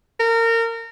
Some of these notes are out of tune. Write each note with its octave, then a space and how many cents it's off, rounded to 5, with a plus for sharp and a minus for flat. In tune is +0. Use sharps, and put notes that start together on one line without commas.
A#4 -25